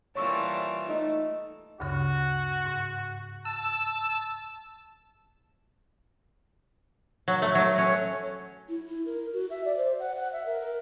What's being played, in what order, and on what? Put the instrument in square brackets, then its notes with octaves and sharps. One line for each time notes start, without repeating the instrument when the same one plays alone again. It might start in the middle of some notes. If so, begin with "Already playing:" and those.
[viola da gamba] E3 G3 A#3 [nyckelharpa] F4 A5 [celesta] C#5 C#6 E6
[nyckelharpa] A3 [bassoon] D#4
[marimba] D2 G2 C#3 [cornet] F#4
[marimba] G#2
[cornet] A5 [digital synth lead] E6
[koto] F#3
A3
F#3
C#4
[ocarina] E4
E4
A#4
F#4
E5
D5
C5
F#5
F#5
E5
A#4
A#4